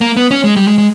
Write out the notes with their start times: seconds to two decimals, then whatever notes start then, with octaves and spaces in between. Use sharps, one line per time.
0.01 A#3
0.17 B3
0.31 C#4
0.44 G#3
0.56 G3
0.68 G#3
0.78 G#3